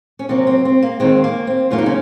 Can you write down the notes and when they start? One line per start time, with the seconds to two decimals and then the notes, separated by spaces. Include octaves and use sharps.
0.19 C#4
0.29 C3 F#3 A#3 C4
0.47 C4
0.65 C4
0.82 A#3
1.00 D#2 D#3 G#3 C4
1.24 A#3
1.47 C4
1.71 F#2 C#3 F#3 A#3 F4
1.78 D#4
1.86 C#4